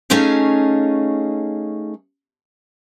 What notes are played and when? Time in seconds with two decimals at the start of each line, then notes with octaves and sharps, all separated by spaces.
0.10 A3 C#4 D#4 G#4 F5